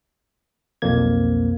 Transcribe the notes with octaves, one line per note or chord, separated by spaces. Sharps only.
B1 F2 A#3 G#6